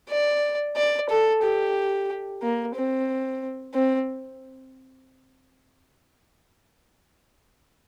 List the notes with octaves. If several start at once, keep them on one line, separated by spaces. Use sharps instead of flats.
D5
D5
A4
G4
A#3
C4
C4